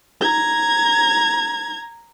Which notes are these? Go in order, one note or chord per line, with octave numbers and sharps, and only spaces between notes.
A#5 G#6